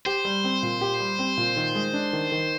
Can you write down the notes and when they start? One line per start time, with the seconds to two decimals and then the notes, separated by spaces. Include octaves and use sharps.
0.06 G4 C5
0.25 G3
0.44 C4
0.63 A#2
0.81 G4
1.00 G3
1.19 C4
1.37 A#2
1.57 D#3
1.75 G#3
1.93 D4
2.13 D#3
2.32 D#3